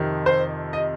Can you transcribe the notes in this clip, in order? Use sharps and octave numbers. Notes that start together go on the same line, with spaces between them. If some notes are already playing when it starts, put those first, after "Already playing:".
Already playing: F2 C3 D#3
C5
D#5